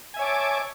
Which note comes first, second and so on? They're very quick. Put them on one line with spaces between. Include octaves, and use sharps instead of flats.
G#5 E5 C#5 D6 A5